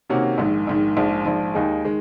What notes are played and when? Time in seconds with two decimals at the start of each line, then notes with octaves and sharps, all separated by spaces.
0.10 C3 D#3 A#3 C#4 F#4
0.38 A#1 G#2 D#3
0.67 A#1 G#2 D#3
0.97 A#1 G#2 F3
1.25 A#1 G#2 F3
1.54 D#2 D#3 G#3 D#4 G#4
1.84 D#3 G#3